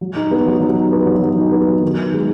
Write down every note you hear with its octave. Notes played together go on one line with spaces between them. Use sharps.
F#3
D#4
B3
F#3
F#3
D#4
B3
F#3
F#3
D#4
B3
F#3
D#3
D#4
G#3